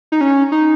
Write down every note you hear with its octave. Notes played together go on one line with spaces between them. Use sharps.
D#4
C#4
D#4